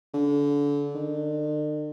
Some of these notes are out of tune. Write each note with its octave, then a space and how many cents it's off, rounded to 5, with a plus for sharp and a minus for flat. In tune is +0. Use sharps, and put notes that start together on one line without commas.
D3 -30
D3 +45